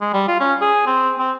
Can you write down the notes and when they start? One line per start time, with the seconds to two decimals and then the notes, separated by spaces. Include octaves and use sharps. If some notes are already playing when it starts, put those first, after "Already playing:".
0.01 G#3
0.13 G3
0.28 F4
0.40 C#4
0.61 G#4
0.86 C4
1.18 C4